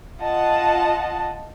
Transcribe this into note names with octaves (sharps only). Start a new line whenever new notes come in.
F4 D#5 F#5 A5